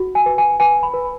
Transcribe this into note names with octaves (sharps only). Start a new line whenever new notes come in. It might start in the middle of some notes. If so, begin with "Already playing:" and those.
Already playing: F#4
G#5
B4
G#5
B4 G#5
B5
B4